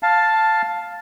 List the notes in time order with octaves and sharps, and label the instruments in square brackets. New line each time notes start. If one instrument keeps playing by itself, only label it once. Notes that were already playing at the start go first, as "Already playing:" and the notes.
[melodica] F5 A5